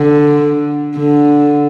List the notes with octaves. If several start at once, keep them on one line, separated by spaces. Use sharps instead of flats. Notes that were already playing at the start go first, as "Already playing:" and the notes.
Already playing: D3
D3